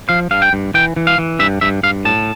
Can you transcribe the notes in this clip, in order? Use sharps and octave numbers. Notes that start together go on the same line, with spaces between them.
F3 F5
G2 F5
G5
G2
E3 G5
E3
F5
E3
G2 E5
G2 E5
G2 F5
A2 A5